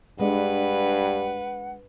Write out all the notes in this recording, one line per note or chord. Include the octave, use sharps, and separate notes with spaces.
G2 G#3 D4 B4 F#5